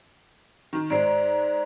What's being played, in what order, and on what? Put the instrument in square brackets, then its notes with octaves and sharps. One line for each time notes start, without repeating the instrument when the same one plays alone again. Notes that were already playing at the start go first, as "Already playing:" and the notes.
[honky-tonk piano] D#3
[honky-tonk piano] G#2 G#3 [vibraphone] C5 D5